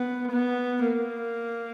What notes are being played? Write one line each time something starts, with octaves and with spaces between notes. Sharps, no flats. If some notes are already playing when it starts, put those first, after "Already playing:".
Already playing: B3
B3
A#3